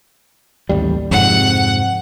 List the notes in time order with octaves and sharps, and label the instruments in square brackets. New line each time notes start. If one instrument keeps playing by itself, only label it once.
[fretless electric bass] A1 D#2 G3
[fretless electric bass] F2 G#2 C3 [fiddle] F#5